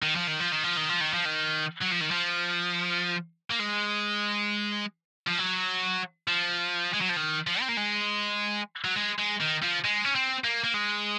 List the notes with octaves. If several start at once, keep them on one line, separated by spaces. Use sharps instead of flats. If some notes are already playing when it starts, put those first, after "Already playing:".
D#3
F3
D#3
F3
D#3
F3
D#3
F3
D#3
F3
D#3
F#3
F3
D#3
F3
A#3
G#3
F3
F#3
F3
G#3
F#3
F3
D#3
F3
C4
A#3
G#3
F#3
G#3
G#3
D#3
F3
G#3
C#4
C4
A#3
A#3
G#3